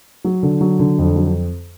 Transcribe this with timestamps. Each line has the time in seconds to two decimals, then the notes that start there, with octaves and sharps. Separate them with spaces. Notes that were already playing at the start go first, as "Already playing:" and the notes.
0.25 F#3
0.43 D3
0.61 F#3
0.79 D3
0.98 F2
1.16 F#3